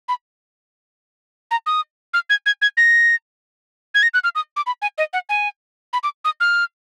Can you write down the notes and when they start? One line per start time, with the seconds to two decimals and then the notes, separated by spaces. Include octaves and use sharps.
0.09 B5
1.51 A#5
1.66 D#6
2.14 F6
2.30 G#6
2.46 G#6
2.62 G#6
2.77 A#6
3.95 G#6
4.03 A#6
4.14 F#6
4.24 F6
4.35 D#6
4.56 D6
4.66 B5
4.82 G#5
4.98 D#5
5.13 F#5
5.29 G#5
5.93 B5
6.03 D6
6.25 D#6
6.40 F6